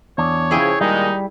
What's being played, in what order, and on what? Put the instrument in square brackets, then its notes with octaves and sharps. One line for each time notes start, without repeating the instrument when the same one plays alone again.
[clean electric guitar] E2 D4 [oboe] C#5
[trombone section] C#3 F3 [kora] E4 G#4 G5
[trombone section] A#2 D#3 G#3 [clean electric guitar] G3 [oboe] D#4